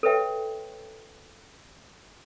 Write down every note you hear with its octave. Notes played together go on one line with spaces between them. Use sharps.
A4 B4 C#5 E5 G5